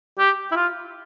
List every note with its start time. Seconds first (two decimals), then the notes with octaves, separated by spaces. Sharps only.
0.19 G4
0.52 E4
0.56 F4